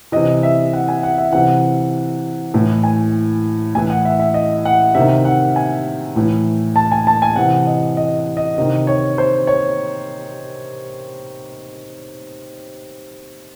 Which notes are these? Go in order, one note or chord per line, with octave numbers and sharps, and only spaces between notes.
C3 E3 D#5
E5
F#5
G#5
F#5
E5
C3 E3 F#5
A2 E3
G#5
A2 E3 G#5
F#5
E5
E5
D#5
F#5
C3 D#3 E5
F#5
G#5
A2 E3
A5
G#5
A5
G#5
C3 E3 F#5
D#5
D#5
D#5
C3 D#3 D#5
C#5
C5
C#5